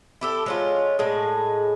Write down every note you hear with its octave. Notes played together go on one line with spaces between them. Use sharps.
E4 G4 A4
G#3 C#4 F4
A2 G#3 G#4